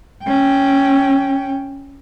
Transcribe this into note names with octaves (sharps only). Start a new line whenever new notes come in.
C#4 G5